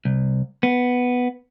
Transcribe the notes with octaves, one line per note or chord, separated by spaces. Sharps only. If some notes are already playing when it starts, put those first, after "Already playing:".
C2
B3